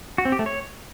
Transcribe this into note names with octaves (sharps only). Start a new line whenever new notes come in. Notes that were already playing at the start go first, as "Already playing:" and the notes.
F#4
C4
G4
A3
C#5